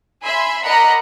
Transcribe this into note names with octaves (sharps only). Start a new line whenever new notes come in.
E5 G#5 B5 C6
A#4 D5 D#5 F#5 A#5 B5